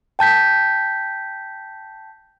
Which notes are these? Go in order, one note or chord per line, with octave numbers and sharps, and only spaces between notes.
G5 A5 G6 B6